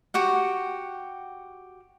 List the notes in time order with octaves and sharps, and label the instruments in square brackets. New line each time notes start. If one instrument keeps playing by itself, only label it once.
[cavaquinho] F#4 G4 F#5